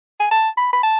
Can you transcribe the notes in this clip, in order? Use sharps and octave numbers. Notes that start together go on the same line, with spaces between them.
G#5
A5
B5
B5
A5